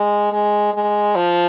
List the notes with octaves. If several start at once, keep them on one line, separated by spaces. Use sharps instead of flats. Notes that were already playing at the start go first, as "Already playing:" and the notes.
Already playing: G#3
G#3
G#3
F3